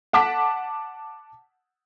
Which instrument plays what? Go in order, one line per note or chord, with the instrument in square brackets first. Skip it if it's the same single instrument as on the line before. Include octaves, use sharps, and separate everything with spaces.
[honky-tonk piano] F#5 A5 D6 B6